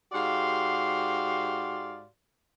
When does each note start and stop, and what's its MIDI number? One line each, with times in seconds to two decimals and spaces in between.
0.12 2.07 44
0.12 2.07 66
0.12 2.07 67
0.12 2.07 74
0.12 2.07 77
0.12 2.07 84